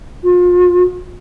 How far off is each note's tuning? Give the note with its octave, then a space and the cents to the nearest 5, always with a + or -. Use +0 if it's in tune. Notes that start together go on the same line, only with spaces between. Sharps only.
F4 +35